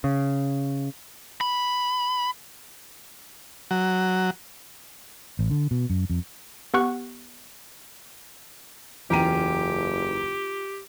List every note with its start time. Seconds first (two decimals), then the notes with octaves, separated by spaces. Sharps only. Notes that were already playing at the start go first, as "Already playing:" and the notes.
0.04 C#3
1.41 B5
3.71 F#3
5.39 A1
5.51 D3
5.71 B2
5.90 F#2
6.10 F2
6.74 B3 G4 F#5 C#6 F#6
9.10 F#1 E2 C#4 F4 G4 G5 A#5 D#7